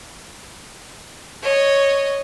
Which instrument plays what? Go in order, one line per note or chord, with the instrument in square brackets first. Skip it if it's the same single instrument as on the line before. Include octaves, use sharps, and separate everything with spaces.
[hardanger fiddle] C#5 D#5